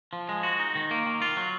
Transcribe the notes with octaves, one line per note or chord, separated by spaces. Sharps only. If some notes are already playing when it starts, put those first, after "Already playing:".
F3
G#3
F#4
D#4
D#3
A#3
D#3
F4
F#3